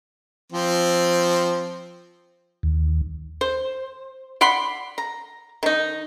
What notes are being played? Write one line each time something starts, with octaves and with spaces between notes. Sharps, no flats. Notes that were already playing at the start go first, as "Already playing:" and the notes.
F3 C4
D#2
C5
D5 F#5 B5 C6
A#5
D#3 D#4